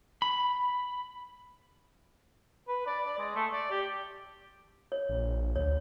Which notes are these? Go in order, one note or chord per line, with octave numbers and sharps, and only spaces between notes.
B5
B4
D5
D5
G#3
A3
D5
G4
C#5
A#1
D2 C#5